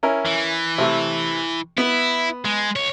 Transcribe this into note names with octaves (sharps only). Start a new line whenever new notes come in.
C#4 E4 A#4
E3
C3 A3
B3 E4
G#3
C#2 C#5